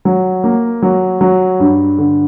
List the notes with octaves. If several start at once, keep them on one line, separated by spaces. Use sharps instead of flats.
F#3
A#3
F#3
F#3
G2
D3